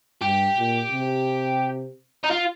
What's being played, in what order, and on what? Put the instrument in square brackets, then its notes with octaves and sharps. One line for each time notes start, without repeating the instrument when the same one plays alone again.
[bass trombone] G2 [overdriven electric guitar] G4
[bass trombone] A#2
C3
[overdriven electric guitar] D#4
F4